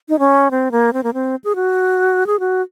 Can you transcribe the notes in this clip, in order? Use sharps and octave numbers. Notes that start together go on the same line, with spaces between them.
D#4
C#4
C4
A#3
C4
A#3
C4
G#4
F#4
G#4
F#4